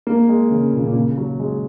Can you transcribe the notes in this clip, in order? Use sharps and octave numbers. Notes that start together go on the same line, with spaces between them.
A#3
G#3
C#3
A#2
C#3
A#2
C#3
F#3
G#3